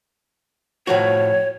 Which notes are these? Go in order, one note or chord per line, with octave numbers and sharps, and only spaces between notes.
A2 F3 F#4 C#5